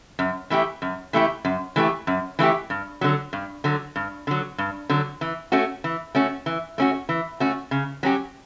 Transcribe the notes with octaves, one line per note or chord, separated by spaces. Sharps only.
F#2
E3 A3 E4 G4
F#2
E3 A3 E4 G4
F#2
E3 A3 E4 G4
F#2
E3 A3 E4 G4
G2
D3 F#3
G2
D3 F#3
G2
D3 F#3
G2
D3 F#3
E3
A3 C#4 F#4
E3
A3 C#4 F#4
E3
A3 C#4 F#4
E3
A3 C#4 F#4
C#3
F#3 C#4 G4